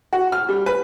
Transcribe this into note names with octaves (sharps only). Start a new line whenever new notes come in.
F#4
F6
G3
B4